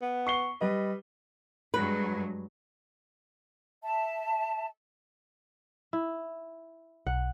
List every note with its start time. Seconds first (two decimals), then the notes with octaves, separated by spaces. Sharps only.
0.02 B3
0.27 C#6 C7 G7
0.61 G3 B4 D#5
1.74 G2 F#3 G#3 B4
3.84 E5 A5
5.93 E4
7.07 B1 F#5